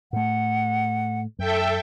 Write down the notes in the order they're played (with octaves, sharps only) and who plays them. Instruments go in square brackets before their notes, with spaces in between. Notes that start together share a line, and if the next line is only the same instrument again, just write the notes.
[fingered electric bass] A2 A3 [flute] F#5
[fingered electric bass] F#2 [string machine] A4 E5 G5